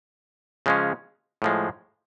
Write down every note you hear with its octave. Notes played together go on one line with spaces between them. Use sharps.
C#3 F3 G#3 C#4
A2 F3 G#3